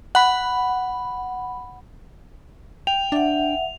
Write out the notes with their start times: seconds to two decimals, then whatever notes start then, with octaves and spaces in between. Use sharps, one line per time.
0.15 F#5 B5
2.87 G5 F7
3.12 D4 E5 F#5